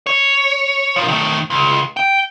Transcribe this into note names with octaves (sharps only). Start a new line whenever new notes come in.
C#5
A#2 F3
D#3 A3
C#2
G5